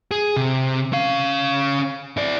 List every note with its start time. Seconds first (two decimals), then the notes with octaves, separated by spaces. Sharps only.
0.11 G#4
0.36 C3
0.92 C#4 F5
2.17 E4 D5